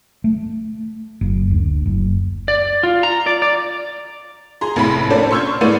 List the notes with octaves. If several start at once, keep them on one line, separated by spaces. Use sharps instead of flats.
A3
F#1
D2
F#1
D5
F4
A#5
D5
D5
G#4 A#5 C6
F1 A2 B5
A#3 C#4 D4 A4 C5 D5
C6 C#6 E6 F6 G6 G#6
A2 G#3 A3 B3 D5 D#7